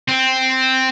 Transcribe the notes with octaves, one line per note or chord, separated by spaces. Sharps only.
C4